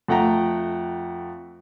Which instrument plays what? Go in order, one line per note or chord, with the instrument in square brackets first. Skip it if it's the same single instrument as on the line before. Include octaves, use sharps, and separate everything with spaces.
[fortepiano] F2 A3 F#5 G5 A#5